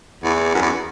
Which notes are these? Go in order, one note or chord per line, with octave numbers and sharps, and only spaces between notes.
E2
F#2
E2